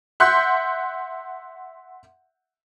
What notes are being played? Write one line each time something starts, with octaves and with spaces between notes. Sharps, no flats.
E5 F#5 C6 F#6 G6